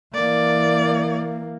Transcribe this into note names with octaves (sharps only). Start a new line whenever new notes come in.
E3 A#3 D5